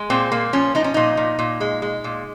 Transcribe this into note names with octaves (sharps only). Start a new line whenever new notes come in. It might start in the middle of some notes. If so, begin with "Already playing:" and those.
Already playing: G#3
A#2 C4
A#2 A#3
F3 C#4
F3 D#4
C#4
A#2 D#4
A#2
A#2
G#3
G#3
A#2